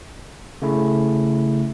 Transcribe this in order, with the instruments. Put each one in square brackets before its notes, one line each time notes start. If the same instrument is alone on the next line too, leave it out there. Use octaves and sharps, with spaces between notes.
[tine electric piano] C#3 A3 E4